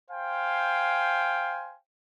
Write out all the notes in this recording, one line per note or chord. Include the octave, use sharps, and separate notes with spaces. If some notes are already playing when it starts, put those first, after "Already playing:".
C5 F5 G5 G#5